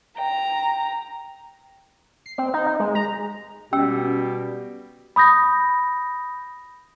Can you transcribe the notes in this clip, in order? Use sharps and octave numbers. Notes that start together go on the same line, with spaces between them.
G5 A#5
C7
C4
D#4
D#4
G#3
A#5
B2 G3 C#4 G4 G5 E6
B5 D#6 G6 A#6